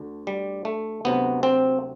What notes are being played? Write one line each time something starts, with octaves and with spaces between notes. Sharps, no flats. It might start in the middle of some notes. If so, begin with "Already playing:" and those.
Already playing: D2 D3
G3
A3
D2 C3 F#3 B3
C4